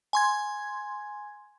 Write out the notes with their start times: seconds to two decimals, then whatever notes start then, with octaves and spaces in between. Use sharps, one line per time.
0.13 G#5 C6 G#6